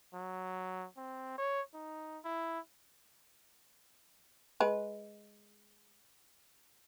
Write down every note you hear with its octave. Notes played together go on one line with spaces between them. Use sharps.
F#3
C4
C#5
D#4
E4
G#3 B4